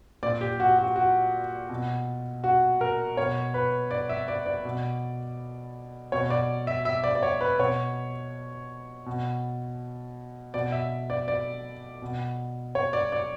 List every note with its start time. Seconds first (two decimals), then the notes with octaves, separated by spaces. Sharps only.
0.23 A#2 D5
0.41 G4
0.60 F#4
0.78 F#4
0.96 F#4
1.69 B2
2.44 F#4
2.81 A#4
3.17 B2 C#5
3.54 B4
3.91 D5
4.09 E5
4.28 D5
4.46 D5
4.65 B2
6.12 B2 C#5
6.30 D5
6.67 E5
6.85 E5
7.04 D5
7.15 D5
7.23 C#5
7.41 B4
7.59 B2 C#5
9.06 B2
10.54 B2 D5
10.72 E5
11.10 D5
11.28 D5
12.02 B2
12.75 C#5
12.93 D5
13.12 D5